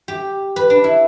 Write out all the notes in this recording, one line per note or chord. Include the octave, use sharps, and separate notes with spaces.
G4
B4
D4
E4